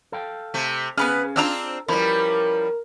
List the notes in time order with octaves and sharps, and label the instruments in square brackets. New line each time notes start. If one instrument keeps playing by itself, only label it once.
[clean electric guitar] A4 F5 G5
[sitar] C3 A3
[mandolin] B3 B4 F6 [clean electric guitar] C#4 F5 G#5 [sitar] G#4
[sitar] C4 D4 F4 [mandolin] A#5 E6 F6
[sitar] F3 G3 [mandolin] C#4 [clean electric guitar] E4 B4 B5 [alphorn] A#4